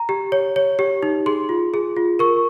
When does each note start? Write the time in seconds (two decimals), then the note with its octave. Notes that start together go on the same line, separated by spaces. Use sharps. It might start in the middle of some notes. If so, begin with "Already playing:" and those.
Already playing: A#5
0.09 G4
0.32 C#5
0.56 C#5
0.79 G4
1.03 D#4
1.26 G#4 C6
1.49 F4
1.74 G#4
1.96 F4
2.19 A#4 C#6